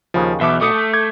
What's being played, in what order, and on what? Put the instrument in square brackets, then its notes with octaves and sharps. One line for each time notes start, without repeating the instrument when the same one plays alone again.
[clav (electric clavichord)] D#2 C#3 D#5 [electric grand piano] F3
[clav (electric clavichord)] B1 B2 [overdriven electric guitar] E2 [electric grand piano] E5 D6
[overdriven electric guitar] A3 [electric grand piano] D6 D#6 C#7
[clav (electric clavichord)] A5
[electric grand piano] D6 G6 G#6